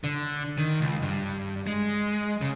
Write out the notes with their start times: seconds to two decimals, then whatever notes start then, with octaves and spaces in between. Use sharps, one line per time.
0.04 D3
0.58 D#3
0.81 C#2
1.02 G2
1.67 G#3
2.41 C#3